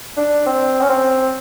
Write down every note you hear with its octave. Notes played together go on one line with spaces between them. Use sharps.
D4
C4
C#4
C4